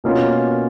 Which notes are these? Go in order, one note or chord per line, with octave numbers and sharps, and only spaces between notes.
B2 A#3 C#4 F4 A#4